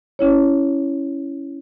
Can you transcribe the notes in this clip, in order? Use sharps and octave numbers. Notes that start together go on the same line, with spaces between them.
C#4 E4 C#5